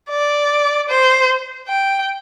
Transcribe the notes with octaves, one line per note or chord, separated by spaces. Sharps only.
D5
C5
G5